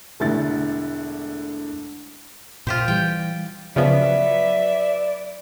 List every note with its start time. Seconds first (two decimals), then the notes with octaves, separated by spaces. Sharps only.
0.20 E1 A2 D3 A6
2.67 A#2 F4 G4 C5
2.88 E3 G3 G5
3.76 C#3 F3 F#3 B3 B4 D5 E5